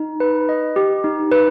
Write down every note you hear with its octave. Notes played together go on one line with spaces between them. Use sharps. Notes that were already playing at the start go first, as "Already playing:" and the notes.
Already playing: D#4
B4
D#5
G4
D#4
B4